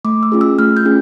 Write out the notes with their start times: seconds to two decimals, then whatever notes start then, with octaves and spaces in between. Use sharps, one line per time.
0.05 A3 D6
0.23 E6
0.32 C#4 F4 G#4
0.41 E6
0.59 A3 F6
0.77 G6
0.85 C#4 F4 G#4